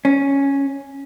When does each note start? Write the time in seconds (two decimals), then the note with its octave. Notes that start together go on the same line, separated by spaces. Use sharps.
0.05 C#4